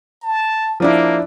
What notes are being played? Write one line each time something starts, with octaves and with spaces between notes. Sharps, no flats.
A5
F3 A#3 D4 E4